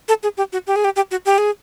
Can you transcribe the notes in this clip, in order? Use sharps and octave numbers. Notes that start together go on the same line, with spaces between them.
A4
G#4
G4
F#4
G4
G#4
G4
G4
F#4
G4
G#4